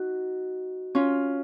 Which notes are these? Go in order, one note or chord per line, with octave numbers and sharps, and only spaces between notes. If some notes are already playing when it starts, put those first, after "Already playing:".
Already playing: D#4 F#4
C#4 F4